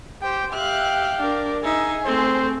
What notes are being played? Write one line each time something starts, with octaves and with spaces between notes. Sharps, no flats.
G4 C5 G5
G4 E5 F5 G5 F#6
D4 A#4
D#4 G#4 E5
A3 C4 C5